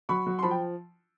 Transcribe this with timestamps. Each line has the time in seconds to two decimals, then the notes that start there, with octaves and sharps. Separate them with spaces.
0.09 F#3 B5 C#6
0.26 F#3
0.39 C6
0.42 F3 A5 B5
0.51 G5